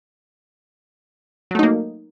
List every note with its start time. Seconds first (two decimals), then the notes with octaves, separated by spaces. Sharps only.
1.51 F#3
1.55 A3
1.59 D#4
1.63 A#3